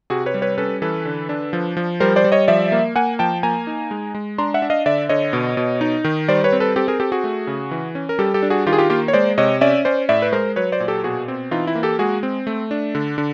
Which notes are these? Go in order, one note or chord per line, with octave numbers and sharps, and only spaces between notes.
C3 F#4 G#4
B4 C#5
G3
B4 C#5
C#4 A4 B4
E3 A4 B4
D3
D4
F3
F3
G3 A#4 C5
C5 D5
G3
C#5 D#5
F3 D5 E5
A#3
A#3 F#5 G#5
F3 G5 A5
A#3 G#5 A#5
D#4
G#3
G#3
D4 A#5 C6
E5 F#5
D4
D#5 F5
D3 D5 E5
D3 C#5 D#5
B2
B2
D#4
D#3
G3 C5 D5
B4 C#5
C4
A4 B4
C4 G4 A4
G#4 A#4
C4 G4 A4
F#4 G#4
A3
C#3
E3
C#4
A#4
G3 G4 A4
G4 A4
D4
F#4 G#4
D#3 F4 G4
G#4
F4 G4
A#3 F4 G4
C#5
G#3 C5 D5
C3 C#5 D#5
C#4 D5 E5
C#4 C5 D5
A2 D5 E5
B4
G#3 A#4 C5
F#3 B4 C#5
C5 D5
A#2
G4 A4
B2 F#4 G#4
C4
E3 D#4 F4
E4
A#3
G4 A4
G#3 F#4 G#4
C4
A3
D4
D3
D3